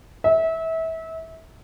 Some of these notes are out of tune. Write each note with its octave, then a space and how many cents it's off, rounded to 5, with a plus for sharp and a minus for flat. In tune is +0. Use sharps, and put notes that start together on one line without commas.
E5 -25